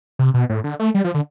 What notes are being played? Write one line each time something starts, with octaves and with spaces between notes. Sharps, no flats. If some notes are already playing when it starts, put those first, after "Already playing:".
C3
B2
A2
D3
A3
G3
F3
D3